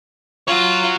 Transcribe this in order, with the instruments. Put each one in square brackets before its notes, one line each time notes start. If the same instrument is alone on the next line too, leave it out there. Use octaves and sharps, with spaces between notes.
[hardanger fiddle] F4 [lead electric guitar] F#4 C#5